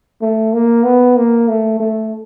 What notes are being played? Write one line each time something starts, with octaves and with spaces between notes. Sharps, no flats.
A3
A#3
B3
A#3
A3
A3